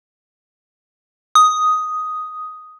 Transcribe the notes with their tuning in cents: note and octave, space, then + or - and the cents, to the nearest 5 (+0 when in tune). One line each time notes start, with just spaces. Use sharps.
D#6 +5